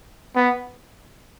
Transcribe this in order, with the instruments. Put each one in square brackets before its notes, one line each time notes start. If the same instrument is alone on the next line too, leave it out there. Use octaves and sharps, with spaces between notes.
[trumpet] B3